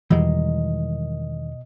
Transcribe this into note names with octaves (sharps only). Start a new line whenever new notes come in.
E2 B2 D#3 E3 G3 G#3 D#5